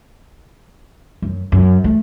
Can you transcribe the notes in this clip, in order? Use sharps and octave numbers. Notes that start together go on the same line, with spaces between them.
F#2
F#2
A3